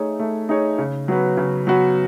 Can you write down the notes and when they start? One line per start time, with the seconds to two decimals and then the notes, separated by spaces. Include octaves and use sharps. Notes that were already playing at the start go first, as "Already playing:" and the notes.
Already playing: A3 D#4 G#4 C#5
0.19 A3
0.49 D#4 G#4 C#5
0.78 C#3
1.08 F#3 B3 F#4 B4
1.37 C#3
1.67 F#3 B3 F#4 B4